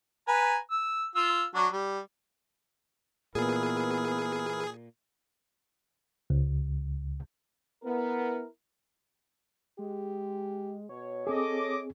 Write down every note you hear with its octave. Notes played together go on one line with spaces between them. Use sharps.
B4 G#5 A#5
E6
F4 E6
F#3 D4 F#4
G3
A#2 E3 B3 E4 G#4 A#4
C#2
B3 E4 A#4
G#3 G4
B2 C#5
C4 G#4 A4 D#5 D6